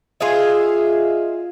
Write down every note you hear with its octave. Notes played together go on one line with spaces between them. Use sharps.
F4 G#4 D#5 E5